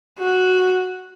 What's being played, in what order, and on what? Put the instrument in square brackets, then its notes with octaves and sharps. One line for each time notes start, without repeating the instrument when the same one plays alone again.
[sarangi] F#4